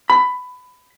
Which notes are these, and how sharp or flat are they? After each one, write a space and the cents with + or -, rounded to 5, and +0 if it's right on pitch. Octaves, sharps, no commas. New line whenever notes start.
B5 +15